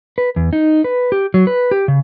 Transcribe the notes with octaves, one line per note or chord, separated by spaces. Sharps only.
B4
E2
D#4
B4
G4
F#3
B4
G4
C#3